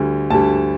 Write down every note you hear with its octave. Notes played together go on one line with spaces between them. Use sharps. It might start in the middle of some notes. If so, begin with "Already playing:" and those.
Already playing: D2 D3 G3
D2 D3 G3 A5